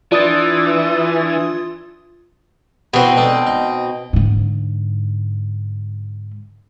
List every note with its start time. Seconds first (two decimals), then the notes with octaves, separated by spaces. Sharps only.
0.12 E3 D4 F4 D#6 A6
2.93 B2 B3 C4 E4 C5
3.17 D4 D#4 A4
3.46 D#4
4.13 G#2 D3